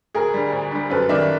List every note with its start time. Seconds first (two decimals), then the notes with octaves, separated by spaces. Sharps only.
0.14 D2 G#4 A#4
0.34 D3 G3
0.52 D2
0.71 D3 G3
0.90 F#2 A4 B4
1.09 D#3 G3 D5 E5